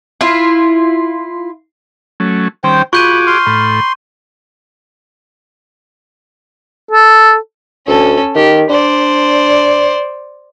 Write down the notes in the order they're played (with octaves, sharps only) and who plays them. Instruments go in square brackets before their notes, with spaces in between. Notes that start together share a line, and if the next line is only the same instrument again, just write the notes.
[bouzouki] E4 F4
[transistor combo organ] F#3 A3 C#4
[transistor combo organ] D#3 G3 C#4 [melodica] C5 G5
[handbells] F4 [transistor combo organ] F#4 G#4 D6 [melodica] B5 [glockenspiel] C#6 G6 D#7
[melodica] C6 [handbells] F6
[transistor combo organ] A2 [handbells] B5
[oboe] A4
[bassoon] D2 [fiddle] C#4 A4
[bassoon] D#3 [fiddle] G4
[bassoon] D4 [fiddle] C5 D5